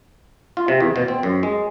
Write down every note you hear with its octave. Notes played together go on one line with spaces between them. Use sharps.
F4
C3
E2
B2
C4
F#2
G#3